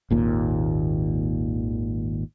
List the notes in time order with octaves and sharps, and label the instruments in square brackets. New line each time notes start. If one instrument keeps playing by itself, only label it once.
[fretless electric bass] G#1 D#2 A#2